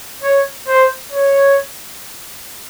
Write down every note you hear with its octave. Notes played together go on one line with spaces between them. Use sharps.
C#5
C5
C#5